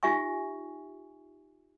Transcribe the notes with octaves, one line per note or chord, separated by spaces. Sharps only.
D#4 F4 G4 E5 G#5 C#6